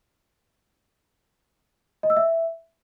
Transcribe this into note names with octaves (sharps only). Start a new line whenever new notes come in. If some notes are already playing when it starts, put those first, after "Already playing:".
D#5
E6
E5